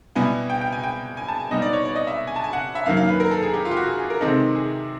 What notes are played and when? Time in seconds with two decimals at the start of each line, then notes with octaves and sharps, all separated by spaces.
0.15 B2 G3 B3 E4 G#5
0.50 G5
0.61 G5
0.72 G#5
0.83 G5
1.17 G#5
1.28 A5
1.40 G#5
1.51 B2 G3 B3 D#4 D#5
1.62 D5
1.73 C#5
1.85 D5
1.96 D#5
2.07 E5
2.27 G#5
2.36 A5
2.44 G#5
2.53 F#5
2.75 E5
2.86 F#2 D#3 F#3 A#3 F5
2.97 F5
3.09 B4
3.20 A#4
3.31 A4
3.43 G#4
3.54 G4
3.65 F4
3.71 G4
3.77 F#4
3.87 G#4
3.99 G#4
4.10 A#4
4.21 C3 D#3 G#3 C4 D#4 A4
4.55 G#4